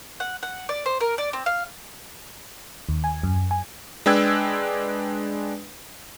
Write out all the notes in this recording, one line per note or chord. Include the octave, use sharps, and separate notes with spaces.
F#5
F#5
D5
C5
A#4
D5
C4
F5
D#2
G#5
F#2
G#5
G#3 D4 B4 G5 E6 G#6